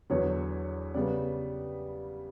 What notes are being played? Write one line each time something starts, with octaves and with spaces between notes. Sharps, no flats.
E2 D3 F#3 B3 C#5
C#3 G3 B3 D5